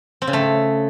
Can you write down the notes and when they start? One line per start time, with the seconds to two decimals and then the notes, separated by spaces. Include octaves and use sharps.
0.22 C4
0.27 C#3
0.33 A3